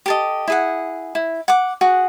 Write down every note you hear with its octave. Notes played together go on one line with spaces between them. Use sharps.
G4 A4 D#5
E4 G#4 F#5
E4
F#5 D6
F#4 G#4 F#5